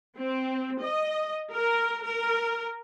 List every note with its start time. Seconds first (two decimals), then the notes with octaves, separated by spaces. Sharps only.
0.19 C4
0.83 D#5
1.53 A#4
2.04 A#4